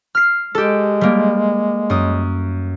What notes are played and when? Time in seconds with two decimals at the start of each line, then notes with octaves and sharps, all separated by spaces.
0.15 F6 C7
0.55 G#3 G4 A4
1.01 G3 A#3
1.90 F#2 D#6